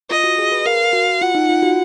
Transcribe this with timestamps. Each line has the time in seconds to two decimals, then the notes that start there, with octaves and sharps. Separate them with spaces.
0.10 F4 D#5
0.24 F#4
0.38 G#4
0.52 B4
0.65 A#4 F5
0.93 F#4
1.21 F4 F#5
1.35 D#4
1.49 F4
1.63 F#4